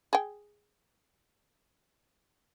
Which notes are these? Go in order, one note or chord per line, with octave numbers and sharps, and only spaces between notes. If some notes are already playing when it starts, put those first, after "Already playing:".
G#4 G5